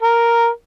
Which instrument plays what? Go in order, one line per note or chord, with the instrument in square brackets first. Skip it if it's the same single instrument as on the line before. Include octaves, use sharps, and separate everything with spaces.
[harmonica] A#4